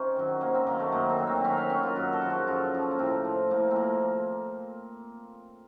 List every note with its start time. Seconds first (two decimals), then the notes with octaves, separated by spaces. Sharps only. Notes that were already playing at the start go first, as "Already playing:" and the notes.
Already playing: C3 C#4 D#4
0.16 D#3 F#3
0.41 C3 A#3
0.54 C4
0.67 D#3 F#3 A#3
0.80 A3
0.92 F#2 A#3
1.10 C4
1.18 D#3 F#3
1.27 C4
1.44 F#2 C#4
1.57 C4
1.70 D#3 F#3 C#4
1.83 F4
1.96 F#2 F#4
2.13 A4
2.22 C#3 F3
2.30 F#4
2.47 F#2 F4
2.74 C#3 F3
2.91 A#3
2.99 A2 C4
3.25 F3
3.50 A2 A#3
3.71 C4
3.76 F3 A#3